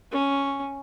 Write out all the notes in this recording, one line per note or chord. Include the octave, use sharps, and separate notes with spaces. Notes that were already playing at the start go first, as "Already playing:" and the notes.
C#4